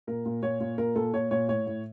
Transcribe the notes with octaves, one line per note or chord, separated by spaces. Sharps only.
A#2 A#4
A#2
A#2 C#5
A#2
A#2 A#4
A#2 A4
A#2 C#5
A#2 C#5
A2 C#5
A2